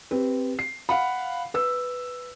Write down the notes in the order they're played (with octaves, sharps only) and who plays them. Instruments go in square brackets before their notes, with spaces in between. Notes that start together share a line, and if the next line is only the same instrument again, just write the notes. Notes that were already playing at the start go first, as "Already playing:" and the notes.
[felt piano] C4 G4 B4
C7
F5 F#5 B5
B4 E6